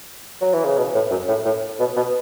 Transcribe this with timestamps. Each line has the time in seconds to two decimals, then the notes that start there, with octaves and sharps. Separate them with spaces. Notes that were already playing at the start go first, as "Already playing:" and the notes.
0.42 F#3
0.53 E3
0.65 C#3
0.77 B2
0.95 A2
1.11 F#2
1.28 A2
1.45 A2
1.80 B2
1.96 B2